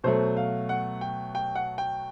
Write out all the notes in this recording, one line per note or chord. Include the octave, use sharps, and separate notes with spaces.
B2 F#3 A3 C5
F5
F#5
G5
G5
F#5
G5